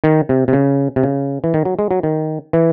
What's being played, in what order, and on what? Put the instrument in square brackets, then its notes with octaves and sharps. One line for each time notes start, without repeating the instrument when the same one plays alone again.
[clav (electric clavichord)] D#3
C3
C3
C#3
C3
C#3
E3
D#3
F#3
G#3
F#3
D#3
E3